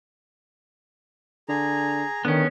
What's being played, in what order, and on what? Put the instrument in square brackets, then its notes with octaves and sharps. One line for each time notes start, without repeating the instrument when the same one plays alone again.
[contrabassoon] D3 [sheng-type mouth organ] G#4 A#5
[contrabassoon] D3 [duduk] D#3 [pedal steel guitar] B3 C#4